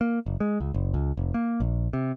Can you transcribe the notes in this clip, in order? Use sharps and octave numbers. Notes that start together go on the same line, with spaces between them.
A#3
F#1
G#3
C#2
F#1
C#2
F1
A#3
A#1
C3